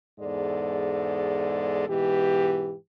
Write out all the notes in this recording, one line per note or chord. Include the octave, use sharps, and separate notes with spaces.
E2 G#2 G#3 A4 D5
G#2 B2 E3 G4